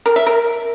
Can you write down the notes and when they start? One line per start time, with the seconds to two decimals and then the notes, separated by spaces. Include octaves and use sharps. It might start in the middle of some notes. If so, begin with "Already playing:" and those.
0.06 A#4
0.16 E5
0.26 A#4